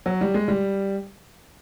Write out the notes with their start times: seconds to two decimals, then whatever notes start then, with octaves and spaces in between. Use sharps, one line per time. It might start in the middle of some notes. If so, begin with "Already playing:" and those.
0.06 F#3
0.21 G3
0.34 G#3
0.48 G3